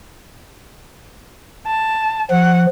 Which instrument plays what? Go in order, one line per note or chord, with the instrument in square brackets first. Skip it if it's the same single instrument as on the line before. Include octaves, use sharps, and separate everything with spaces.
[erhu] A5
[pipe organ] F3 [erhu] F#5